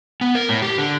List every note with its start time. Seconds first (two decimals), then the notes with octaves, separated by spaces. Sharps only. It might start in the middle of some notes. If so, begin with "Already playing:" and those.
0.21 B3
0.35 A#4
0.49 A2
0.62 G4
0.78 D3